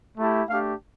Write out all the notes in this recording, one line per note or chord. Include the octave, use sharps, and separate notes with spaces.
A3 E4 G4 A5
A3 D4 G4 F5